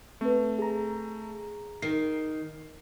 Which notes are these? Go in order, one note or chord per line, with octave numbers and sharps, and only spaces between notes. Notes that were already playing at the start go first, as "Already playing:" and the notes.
A3 C4 B4
G#4 A#5
D#3 C7